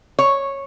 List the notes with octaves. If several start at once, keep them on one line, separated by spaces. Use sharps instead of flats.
C#5